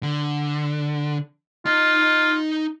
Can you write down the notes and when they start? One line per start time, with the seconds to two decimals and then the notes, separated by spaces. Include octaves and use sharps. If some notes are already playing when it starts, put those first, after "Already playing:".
0.03 D3
1.66 D#4 F4 D#5